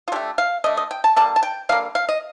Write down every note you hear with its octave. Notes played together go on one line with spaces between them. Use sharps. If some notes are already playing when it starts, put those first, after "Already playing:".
F4
D3 A3 G4
F5
D3 A3 D#5
D#5
G5
A5
D3 G3 A#3 A5
A5
G5
D3 G3 A#3 F5
F5
D#5